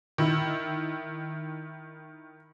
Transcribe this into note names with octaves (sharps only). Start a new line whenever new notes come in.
D#3 E4